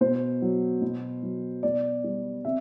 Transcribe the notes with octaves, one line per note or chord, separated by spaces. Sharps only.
B2 C5
F#3
B2
F#3
B2 D5
G3
C3 E5